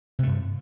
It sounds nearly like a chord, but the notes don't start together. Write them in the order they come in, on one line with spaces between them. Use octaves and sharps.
C3 A3 G2